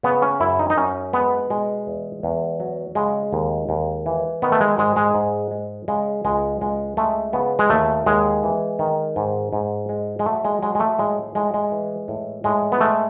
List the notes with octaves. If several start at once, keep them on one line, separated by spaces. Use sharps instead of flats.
C#3 B3
C#4
F#2 E4
D#4
D#4
F#2 C#4
G#3 B3
B2 G#3
E2
E2
F#3
C#3 G#3
D#2
D#2
E3
D#3 B3
A3
G#3
G#2 G#3
G#3
G#2
G#3
C#3 G#3
C#2 G#3
C#2 G#3
G#3 A3
C#3 B3
G#3
D#2 A3
D#2 G#3
E3
D#3
G#2
G#2
G#3
G#3
F#3 A3
G#3
F#3 G#3
G#3
A3
A2 G#3
A2 G#3
G#3
E3
A2
A2 G#3
B3
G#3 A3